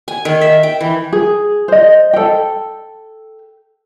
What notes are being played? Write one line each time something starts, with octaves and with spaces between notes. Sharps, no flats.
G#5
D#3
E5
G5
E3
G#4
C5 D#5
A4 G5